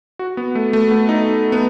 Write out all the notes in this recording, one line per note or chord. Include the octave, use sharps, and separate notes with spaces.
F#4
B3
A3
A3
B3
D#4
B3